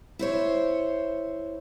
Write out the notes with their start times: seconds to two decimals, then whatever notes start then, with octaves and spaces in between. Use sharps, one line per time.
0.19 E4 C5 C#5